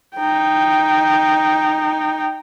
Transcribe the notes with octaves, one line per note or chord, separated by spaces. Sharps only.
D#4 G5